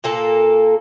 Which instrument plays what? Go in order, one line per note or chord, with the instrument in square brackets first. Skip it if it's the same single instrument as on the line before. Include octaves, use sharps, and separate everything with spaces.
[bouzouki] A#2 A#3 A4